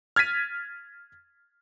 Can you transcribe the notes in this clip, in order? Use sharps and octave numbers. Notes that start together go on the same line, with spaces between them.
F6 G#6 A6 B6 D#7